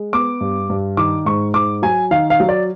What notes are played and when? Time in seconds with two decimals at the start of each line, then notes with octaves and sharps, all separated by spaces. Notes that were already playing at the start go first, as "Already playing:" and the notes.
Already playing: G#3
0.13 B3 D6
0.41 G2
0.70 G2
0.97 D#3 D6
1.26 G#2 C#6
1.54 G#2 D6
1.82 F#3 G#5
2.11 D#3 F5
2.30 F5
2.40 F#3
2.49 D5